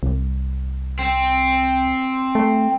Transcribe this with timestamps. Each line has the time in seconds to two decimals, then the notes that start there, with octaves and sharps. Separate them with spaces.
0.03 C2
0.99 C4
2.35 A3